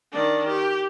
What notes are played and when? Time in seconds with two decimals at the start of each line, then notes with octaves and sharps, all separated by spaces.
0.13 D#3 D4
0.48 G4